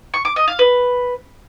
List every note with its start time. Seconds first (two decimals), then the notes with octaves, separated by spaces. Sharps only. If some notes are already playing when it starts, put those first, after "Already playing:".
0.14 C#6
0.25 D6
0.36 D#5
0.48 F5
0.59 B4